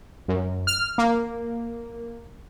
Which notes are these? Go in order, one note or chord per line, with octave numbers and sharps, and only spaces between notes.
F#2
F6
A#3